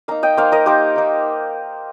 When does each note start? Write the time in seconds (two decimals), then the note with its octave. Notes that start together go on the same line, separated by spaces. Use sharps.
0.08 A#3 D#4 F5 A#5
0.23 D#5 G5
0.37 A#3 D#4 C5 F5
0.52 A#4 D#5
0.66 A#3 D#4 G4 C5
0.96 A#3 D#4